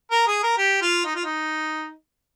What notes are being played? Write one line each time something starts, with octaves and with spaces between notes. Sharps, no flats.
A#4
G#4
A#4
G4
F4
D#4
F4
D#4